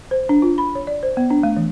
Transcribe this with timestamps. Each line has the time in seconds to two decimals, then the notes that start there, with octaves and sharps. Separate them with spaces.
0.11 C5
0.29 D4
0.42 F4
0.58 B5
0.75 C#5
0.87 D5
1.03 C5
1.17 B3
1.30 D4
1.43 A3
1.57 E3